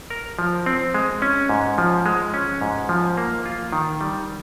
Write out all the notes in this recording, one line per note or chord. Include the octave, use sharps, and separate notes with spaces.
A#4
F3
C4
G#3
C#4
G#2
F3
G#3
C#4
G#2
F3
A#3
F4
D#3
G3